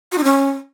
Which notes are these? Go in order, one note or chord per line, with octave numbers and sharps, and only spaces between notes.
F#4
D#4
C#4